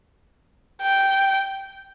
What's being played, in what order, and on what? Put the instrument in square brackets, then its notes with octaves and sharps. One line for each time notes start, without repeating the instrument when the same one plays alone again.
[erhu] G5